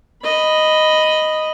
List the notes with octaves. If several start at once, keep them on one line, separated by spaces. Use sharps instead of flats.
D#5 B5